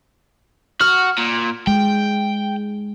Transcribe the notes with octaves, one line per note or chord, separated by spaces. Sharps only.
F#4 F6
A#2
G#3 G5